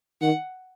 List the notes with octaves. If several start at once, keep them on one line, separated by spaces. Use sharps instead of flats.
D#3 F#5